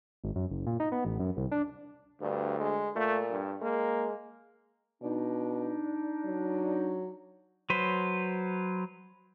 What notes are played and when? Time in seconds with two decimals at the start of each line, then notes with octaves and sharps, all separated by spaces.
0.24 G#1
0.36 F#2
0.51 F#1
0.67 A#2
0.80 D#4
0.92 B3
1.05 A1
1.20 F#2
1.37 C2
1.52 D4
2.21 D2 G2
2.60 G#3
2.96 A#2 A3
3.31 G2
3.62 G#3 A#3
5.02 B2 D4 D#4
6.25 F#3
7.70 F#3 B4 C5